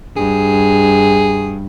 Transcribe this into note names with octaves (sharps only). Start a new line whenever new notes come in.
G2 G#4